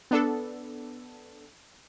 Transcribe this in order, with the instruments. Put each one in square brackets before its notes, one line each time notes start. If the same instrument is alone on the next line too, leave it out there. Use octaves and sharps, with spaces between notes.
[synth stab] B3 D4 A4